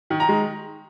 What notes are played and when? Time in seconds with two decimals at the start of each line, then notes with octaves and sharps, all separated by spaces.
0.10 D#3
0.20 A#5
0.29 G#3